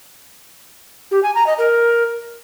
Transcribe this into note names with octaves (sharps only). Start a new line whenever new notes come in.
G4
G#5
A#5
D#5
A#4